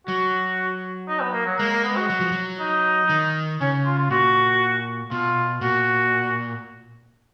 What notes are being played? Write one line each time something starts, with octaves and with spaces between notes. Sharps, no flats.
F#3 F#4
D#4
B3
A#3
F#3
G#3 A#3
A#3
B3
F#4
F#3
F3
F#3
D#4
D#3
C#3 C#4
F4
F4
A#2 F#4
B2 F4
A#2 F#4